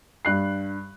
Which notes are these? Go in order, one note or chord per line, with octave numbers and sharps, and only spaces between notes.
G2 F#6 C7